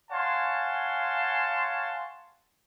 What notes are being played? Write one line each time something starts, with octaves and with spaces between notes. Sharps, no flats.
C#5 F5 F#5 G#5 A5 C6